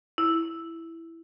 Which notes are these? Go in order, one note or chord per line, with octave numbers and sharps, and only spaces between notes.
E4